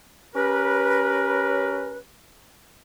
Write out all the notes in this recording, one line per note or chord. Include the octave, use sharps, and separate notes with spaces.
C#4 G4 A#4 B4